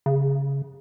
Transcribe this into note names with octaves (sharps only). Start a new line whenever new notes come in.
C#3